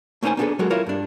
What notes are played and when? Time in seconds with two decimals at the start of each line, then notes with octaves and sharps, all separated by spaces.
0.23 A3 A#3 C#4 D#4 C5 G#5
0.37 A#3 B3 D4 F#4 G#4 A4
0.59 F#3 G#3 F#4 A4 A#4
0.70 E4 F4 A#4 C#5
0.87 G2 D4